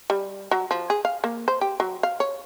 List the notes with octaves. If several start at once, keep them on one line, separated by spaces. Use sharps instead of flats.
G3
F#3
F3
G#4
F5
A#3
C5
G4
F#3
F5
C#5